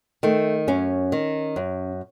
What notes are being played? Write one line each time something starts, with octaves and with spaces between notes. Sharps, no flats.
D#3 A3
F#2 C#4
D#3
F#2